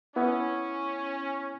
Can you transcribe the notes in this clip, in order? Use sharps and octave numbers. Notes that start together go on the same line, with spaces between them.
B3 C#4 E4